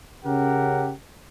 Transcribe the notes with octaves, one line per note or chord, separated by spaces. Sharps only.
C#3 C#4 G4 A#4 F#5